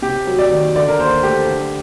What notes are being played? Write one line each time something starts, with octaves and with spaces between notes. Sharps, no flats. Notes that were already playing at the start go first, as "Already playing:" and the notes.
C3 G4
F#3
D5
D#3
D3 D5
A#4
D#2 C5
A3 G4
D3